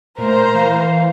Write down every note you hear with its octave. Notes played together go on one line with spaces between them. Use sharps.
A#2 A3 A#4 C5 A#5
E3 F5